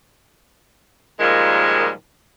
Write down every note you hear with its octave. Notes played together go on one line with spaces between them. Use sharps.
A#2 D#3 F3 G3 G#3